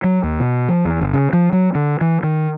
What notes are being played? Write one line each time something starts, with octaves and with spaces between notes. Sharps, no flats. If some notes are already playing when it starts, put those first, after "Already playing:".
F#3
D#2
B2
F3
E2
G1
C#3
F3
F#3
D3
E3
D#3